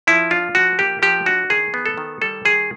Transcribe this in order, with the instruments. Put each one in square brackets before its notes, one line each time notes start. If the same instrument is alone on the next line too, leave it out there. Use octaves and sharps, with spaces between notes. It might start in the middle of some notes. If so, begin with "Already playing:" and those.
[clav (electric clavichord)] F3 E4
D4 F4
F3 F#4
A#3 G4
F3 G4
D4 F#4
D#3 G#4
B3
A4
D#3
G3 A4
D#3 G#4